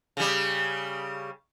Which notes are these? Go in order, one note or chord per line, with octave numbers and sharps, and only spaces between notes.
C#3 G3